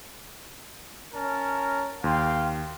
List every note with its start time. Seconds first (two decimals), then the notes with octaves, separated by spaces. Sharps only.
1.12 C#4 A#4 A5
2.04 D#2 F5 G5 C6